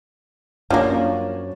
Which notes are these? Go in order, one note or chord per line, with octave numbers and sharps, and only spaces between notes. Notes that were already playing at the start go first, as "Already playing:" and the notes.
F#2 F3 A#3 C#4 D4